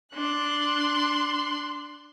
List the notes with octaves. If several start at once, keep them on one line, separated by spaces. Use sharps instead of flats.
D4 C6 F#6